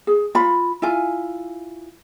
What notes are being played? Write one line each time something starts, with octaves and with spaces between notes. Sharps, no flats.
G#4
F4 B5
E4 F4 G#5